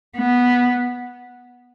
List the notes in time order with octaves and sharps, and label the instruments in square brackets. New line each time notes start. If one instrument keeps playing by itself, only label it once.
[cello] B3